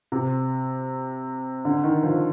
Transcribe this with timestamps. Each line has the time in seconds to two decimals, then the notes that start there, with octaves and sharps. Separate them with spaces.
0.12 C3
1.65 D3
1.84 D#3
2.03 F3